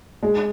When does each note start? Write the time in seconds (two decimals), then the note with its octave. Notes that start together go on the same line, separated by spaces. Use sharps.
0.23 G#3